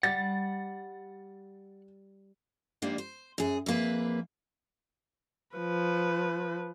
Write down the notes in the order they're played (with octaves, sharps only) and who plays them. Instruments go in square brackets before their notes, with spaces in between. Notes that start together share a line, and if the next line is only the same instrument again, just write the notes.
[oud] G3 [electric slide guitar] F#5 [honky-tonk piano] A6
[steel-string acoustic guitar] G#2 F3 G3 A#3 D4
C5
F#2 G#4
F2 E3 A#3 G#4 B4
[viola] F3 B4